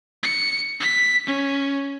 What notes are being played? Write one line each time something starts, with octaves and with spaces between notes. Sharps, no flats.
C#7
B6
C#4